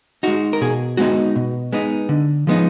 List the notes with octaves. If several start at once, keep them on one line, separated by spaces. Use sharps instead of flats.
G#3 D#4 F#4
A#4
B2 G#4
G#3 B3 D#4 F#4
B2
G#3 B3 D#4
D3
F3 G#3 B3 D#4